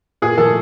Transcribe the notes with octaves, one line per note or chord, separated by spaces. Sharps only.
A#2 G#4
F3 A3 A4